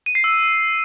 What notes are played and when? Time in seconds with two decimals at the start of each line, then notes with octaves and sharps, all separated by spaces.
0.06 D#7
0.15 C7
0.24 E6